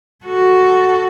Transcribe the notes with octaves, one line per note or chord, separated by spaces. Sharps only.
F#4 A4